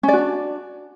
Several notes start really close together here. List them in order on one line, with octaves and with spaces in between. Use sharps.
C#4 D5 F#4 D4